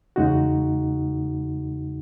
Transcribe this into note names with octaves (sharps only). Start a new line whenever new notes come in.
E2 C#3 G#3 D#4 F#4